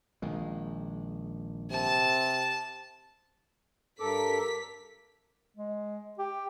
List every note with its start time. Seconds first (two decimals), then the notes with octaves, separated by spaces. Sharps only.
0.22 A#1 D#3 G#3
1.71 C3 A5
4.00 G2 A4 A#4 D6 B6
5.56 G#3
6.19 G4